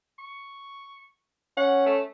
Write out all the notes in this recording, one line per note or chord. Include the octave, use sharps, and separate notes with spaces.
C#6
C#4 F#5
A3